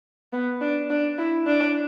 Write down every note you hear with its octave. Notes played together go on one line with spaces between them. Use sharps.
B3
D4
D4
E4
D4